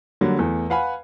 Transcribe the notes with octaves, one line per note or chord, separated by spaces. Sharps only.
D3 F#3 G3 A#3
E2 E3 A3
B4 F5 F#5 G#5 B5